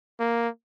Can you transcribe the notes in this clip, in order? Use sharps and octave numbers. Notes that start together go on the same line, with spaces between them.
A#3